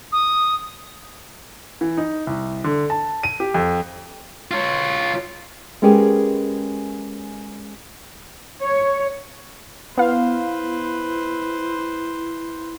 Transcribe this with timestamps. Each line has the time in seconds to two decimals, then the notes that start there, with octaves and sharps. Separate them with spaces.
0.12 D#6
1.81 E3
1.97 D#4
2.27 C2
2.64 D3
2.90 A5
3.23 D#7
3.40 G4
3.54 F2
4.51 F4 C#5
5.82 G#3 B3 C#4 G4 G#4 A#4
8.61 C#5
9.97 B3 E4 B4 C5 F5